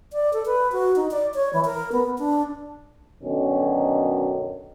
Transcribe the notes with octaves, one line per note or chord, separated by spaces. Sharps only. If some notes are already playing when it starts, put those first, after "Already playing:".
D5
A4
B4
F#4
D#4
D5
C#5
E3
A#4
B3
D4
F#2 B2 D3 D#3 C#4